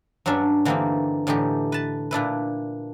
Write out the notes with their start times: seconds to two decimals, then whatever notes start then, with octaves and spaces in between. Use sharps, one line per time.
0.26 G2 F#3 C#4 D4 E5
0.65 D3 E3 G3 A#3 C4 D#4
1.27 A2 D3 E3 D#4 G4
1.72 B4 A5
2.11 A#2 D4 E4 B4